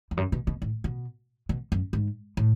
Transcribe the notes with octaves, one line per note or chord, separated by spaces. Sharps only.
E2
F#2
B2
B2
A2
B2
B2
F#2
G#2
A2